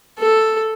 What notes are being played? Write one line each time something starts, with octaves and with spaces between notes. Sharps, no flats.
A4